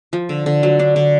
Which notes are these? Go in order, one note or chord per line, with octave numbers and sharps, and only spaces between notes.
F3
D3
D3
F#3
D4
D3